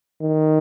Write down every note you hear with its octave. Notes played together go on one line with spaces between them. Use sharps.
D#3